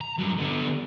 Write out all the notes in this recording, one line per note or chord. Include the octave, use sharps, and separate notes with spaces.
A#5
G2 F#3
D3 B3